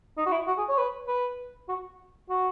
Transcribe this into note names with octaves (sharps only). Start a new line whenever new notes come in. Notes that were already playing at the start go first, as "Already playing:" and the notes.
D#4
F#4
E4
F#4
G#4
C#5
B4
B4
F#4
F#4